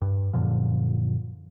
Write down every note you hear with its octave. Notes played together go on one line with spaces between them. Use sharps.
G2
F#2 A#2 D3 F3